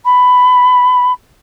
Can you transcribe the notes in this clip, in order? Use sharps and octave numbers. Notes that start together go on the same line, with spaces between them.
B5